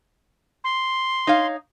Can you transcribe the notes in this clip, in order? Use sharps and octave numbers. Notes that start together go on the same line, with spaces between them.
C6
D#4 C#5 F5